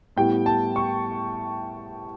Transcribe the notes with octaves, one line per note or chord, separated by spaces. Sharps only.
A2 G3 B3 G5
A5
C#6